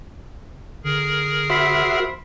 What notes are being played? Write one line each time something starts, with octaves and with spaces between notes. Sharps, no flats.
D3 G#4 A#4
F#4 C5 E5 B5